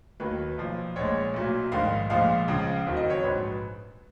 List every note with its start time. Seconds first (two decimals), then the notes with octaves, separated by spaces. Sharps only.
0.20 D#2 D#3 F#3 B4
0.58 B1 A#2 F3
0.96 A#1 A#2 G#3 C#5
1.34 B1 A#2 F#3
1.72 A#1 G#2 D#3 F5
2.10 A#1 A#2 F3 G#3 F5
2.48 C#2 C#3 F3
2.86 F#1 F2 D#3 F#3
2.97 D#5
3.10 C#5
3.23 A#1 G#2 F#3 B4